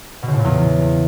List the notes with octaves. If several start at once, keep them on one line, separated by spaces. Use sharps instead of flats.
B2
C#3
A2
A#2
E2